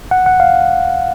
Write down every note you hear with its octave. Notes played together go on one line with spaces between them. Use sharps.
F#5
F#5
F5